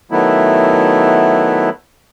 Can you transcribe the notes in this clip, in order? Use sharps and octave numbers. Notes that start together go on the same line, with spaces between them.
D#3 F#3 A3 B3 E4